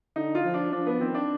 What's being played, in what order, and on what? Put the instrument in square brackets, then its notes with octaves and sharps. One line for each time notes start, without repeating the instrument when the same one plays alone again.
[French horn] D3 [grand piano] D#4
[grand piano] F4
[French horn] F3
[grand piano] D4
[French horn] F3 [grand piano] D4
[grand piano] B3
[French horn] D#3 [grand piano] C4
[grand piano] D4